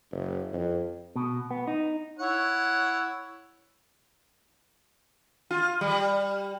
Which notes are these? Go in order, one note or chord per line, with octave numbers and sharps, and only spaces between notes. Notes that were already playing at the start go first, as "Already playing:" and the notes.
F#1
F2
B2
B3
D#4
E4 C#5 F#5
F4
G3